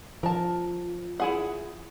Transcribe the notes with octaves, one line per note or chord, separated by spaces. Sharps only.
F3 A#4 A5
E4 G#4 F#5